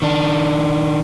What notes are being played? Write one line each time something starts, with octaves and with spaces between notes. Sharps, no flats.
D#3 D4